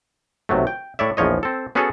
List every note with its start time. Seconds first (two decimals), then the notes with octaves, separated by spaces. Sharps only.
0.49 B1 C3 F#3 A3
0.67 G5
0.99 A2 C#5 D5 E5
1.17 A#1 E2 F3 C#5 D#5
1.43 C4 A4
1.75 B3 C#4 F#4 G#4 A4 C#5